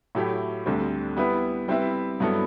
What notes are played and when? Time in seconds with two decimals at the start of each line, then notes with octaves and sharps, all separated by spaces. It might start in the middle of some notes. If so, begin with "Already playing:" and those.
0.15 A2 F#3 A3 E4 G4
0.66 D2 D3 G3 C4
1.16 G3 B3 E4 B4
1.68 G3 C4 E4 B4 E5
2.20 G2 F#3 B3 E4 A4